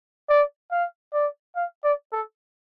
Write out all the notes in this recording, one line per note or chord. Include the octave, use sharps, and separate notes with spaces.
D5
F5
D5
F5
D5
A4